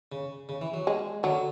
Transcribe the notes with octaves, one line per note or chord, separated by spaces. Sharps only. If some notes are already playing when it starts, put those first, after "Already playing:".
C#3
C#3
E3
F#3
G#3
D3 F#3